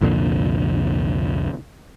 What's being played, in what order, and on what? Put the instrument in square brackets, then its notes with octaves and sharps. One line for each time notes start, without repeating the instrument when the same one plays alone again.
[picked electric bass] C2 F2 A#2 D3